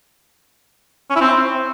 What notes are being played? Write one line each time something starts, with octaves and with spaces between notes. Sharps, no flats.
C#4
E4
C4